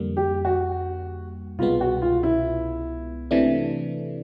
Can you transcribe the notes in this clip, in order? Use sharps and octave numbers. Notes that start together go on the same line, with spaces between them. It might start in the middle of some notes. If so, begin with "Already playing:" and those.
Already playing: F2 D3 G3 A#3
G4
F#4
C2 B2 G#3 B3 F4
F#4
F4
E4
C3 E3 A3 D4